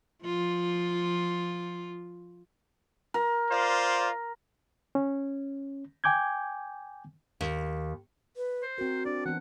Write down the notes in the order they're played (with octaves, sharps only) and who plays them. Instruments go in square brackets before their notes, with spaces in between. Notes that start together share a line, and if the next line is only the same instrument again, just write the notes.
[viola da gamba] F3 F4
[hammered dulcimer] A#4
[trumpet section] F4 C5 D5
[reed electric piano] C#4
G5 G#5 D6 G6 G#6
[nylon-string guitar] D#2
[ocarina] B4
[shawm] C5
[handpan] C4 A#4 [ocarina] F#4
[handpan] D4 [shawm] D5
[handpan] E3 B3 [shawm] F#5